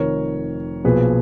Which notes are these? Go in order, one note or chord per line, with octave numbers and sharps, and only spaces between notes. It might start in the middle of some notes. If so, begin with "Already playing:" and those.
Already playing: F1 F2 D#3 A#4 C#5
B1 A#2 F3 G#4 B4